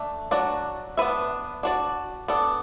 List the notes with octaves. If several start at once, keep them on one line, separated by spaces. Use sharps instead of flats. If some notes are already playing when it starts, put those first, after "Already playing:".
Already playing: A3 D4
F#3 D4 F#4 D5
B3 D4 B4 E5
D4 F#4 D5
B3 D4 A4 D5